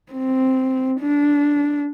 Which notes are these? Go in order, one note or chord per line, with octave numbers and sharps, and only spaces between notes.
C4
D4